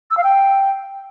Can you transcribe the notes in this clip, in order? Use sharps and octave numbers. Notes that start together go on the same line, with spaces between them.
E6
F5
G5